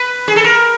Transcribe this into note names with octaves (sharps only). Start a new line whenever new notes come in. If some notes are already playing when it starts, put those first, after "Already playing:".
Already playing: B4
G#4
A4
A#4